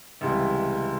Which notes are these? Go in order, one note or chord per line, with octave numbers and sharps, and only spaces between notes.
C#2 C3 E3 G3